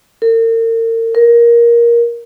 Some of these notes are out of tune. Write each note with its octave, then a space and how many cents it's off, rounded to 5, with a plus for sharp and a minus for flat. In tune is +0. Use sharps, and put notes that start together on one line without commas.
A#4 -40
A#4 +15